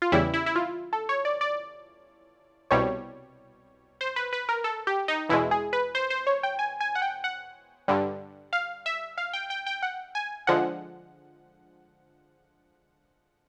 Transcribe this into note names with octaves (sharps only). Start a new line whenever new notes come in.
F4
E2 C#3 E3 G3 E4
E4
E4
F4
A4
C#5
D5
D5
C2 B2 G3 C#5
C5
B4
B4
A#4
A4
G4
D#4
E2 B2 G#3 E4
G#4
B4
C5
C5
C#5
G5
G#5
G#5
F#5
G5
F#5
G2 D3 G3
F5
E5
F5
G5
G5
G5
F#5
G#5
D3 F3 G#3 F#5